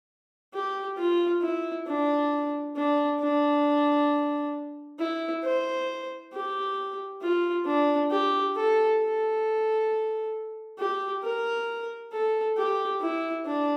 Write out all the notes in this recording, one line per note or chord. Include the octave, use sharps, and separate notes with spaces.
G4
F4
E4
D4
D4
D4
E4
C5
G4
F4
D4
G4
A4
A4
G4
A#4
A4
G4
E4
D4